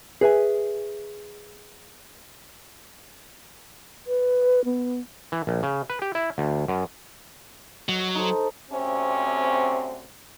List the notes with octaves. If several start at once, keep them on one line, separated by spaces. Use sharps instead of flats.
G#4 B4 E5 G#5
B4
B3
E3
A#1
C#3
B4
G4
E4
D2
F#2
F#3 D#5
D#4 A4 C5
D2 C3 C4 C#4